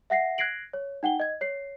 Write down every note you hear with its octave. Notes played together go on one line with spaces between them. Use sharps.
E5 F#5 A#6 C7
F#6 G#6 A#6 C7 D7 F#7
C#5
D#4 F#5 G5 G7
D#5 G#6
C#5 C7